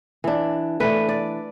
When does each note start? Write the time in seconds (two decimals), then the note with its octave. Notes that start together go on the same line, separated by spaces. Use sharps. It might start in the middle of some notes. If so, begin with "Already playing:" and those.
0.24 E3 D4
0.80 E3 A3 D4 B4
1.09 D5